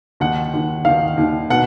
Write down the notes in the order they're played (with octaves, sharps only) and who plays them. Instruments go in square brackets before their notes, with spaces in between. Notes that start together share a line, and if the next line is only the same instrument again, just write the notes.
[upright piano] D#2 D#3 F#5
D#2 D#3
D#2 D#3 F5
D#2 D#3
B2 F#5